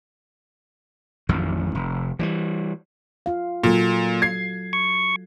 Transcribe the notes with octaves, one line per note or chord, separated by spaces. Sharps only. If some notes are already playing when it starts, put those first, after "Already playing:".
A1 F2 D#3 F#3
F1
E3 F#3 G3
F4 F5
A#2 F#3 F#4 A4
G#6 C7
C#6